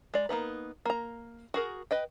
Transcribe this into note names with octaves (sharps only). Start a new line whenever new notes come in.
G#3 D5
A#3 B3 D#4 B4
A#3 A#5
F#4 G#4 A#4
B4 D#5 G5